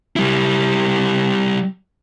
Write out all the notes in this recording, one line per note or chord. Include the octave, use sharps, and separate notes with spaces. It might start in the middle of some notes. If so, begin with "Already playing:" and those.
G3 E4